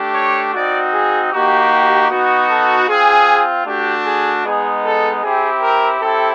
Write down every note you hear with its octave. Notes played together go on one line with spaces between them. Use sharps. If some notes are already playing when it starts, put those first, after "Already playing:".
Already playing: A3 D4 G4
C#5
C4 D#4 F#4 D5
G#4
A#3 D#4 F#4 G4
B3 D#4 F#4
A4
C4 F4 G#4
A3 D4 F#4 G4
G#4
G#3 B3 D#4 G#4
A4
C4 E4 G4 G#4
A#4
C4 E4 G4 A4